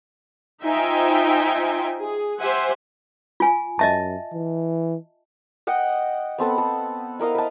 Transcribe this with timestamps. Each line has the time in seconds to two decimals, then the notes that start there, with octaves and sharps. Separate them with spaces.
0.63 D#4 F4 C5 E5 G5 G#5
1.98 G#4
2.40 G4 C5 E5 F#5 G#5
3.40 F4 G#5
3.79 F#2 D#5 E5 A5
4.32 E3
5.67 D#5 F#5 G5
6.38 B3 C4 A4 B4
6.58 A4
7.19 E4 A#4 D#5 F5
7.35 B4 A5